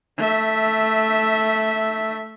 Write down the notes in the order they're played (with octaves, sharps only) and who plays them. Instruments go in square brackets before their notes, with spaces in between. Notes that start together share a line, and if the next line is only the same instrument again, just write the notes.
[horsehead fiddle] A3 E5